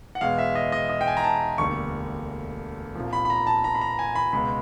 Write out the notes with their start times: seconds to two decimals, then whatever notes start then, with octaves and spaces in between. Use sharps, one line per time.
0.15 F#5
0.21 E2 B2 G#3 F5
0.38 E5
0.55 D#5
0.72 D#5
0.89 D#5
1.01 G5
1.07 G#5
1.17 A#5
1.24 A5
1.58 E1 D2 D3 G3 A#3 C#6
2.96 C2 A#2 F3
3.13 B5
3.25 B5
3.30 A#5
3.47 A5
3.64 A#5
3.75 B5
3.81 A#5
3.99 G#5
4.15 B5
4.33 C#2 B2 G#3 B5